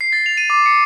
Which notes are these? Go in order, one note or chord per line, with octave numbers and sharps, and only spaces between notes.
C7
A6
F7
D#7
D6
C#7